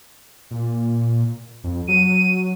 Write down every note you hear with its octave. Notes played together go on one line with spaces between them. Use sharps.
A#2
F2
F#3 D#7